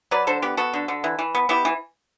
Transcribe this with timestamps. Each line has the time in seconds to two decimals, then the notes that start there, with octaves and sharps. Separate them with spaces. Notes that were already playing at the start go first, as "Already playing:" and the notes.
0.11 F#3 B4 D5
0.27 D3 A4 C5
0.42 B3 G4 B4
0.57 B3 F#4 A4
0.73 D3
0.88 D3
1.04 E3
1.19 E3
1.35 B3
1.49 B3 E4 G4
1.65 E3